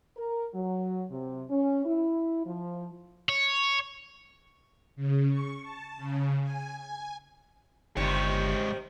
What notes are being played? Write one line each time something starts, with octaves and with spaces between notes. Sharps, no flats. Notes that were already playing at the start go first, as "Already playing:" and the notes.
A#4
F#3
C3
C#4
E4
F3
C#5
C#3
C#6
A5
C#3
G#5
G#5
G1 G#2 C3 D#3 G3 C#5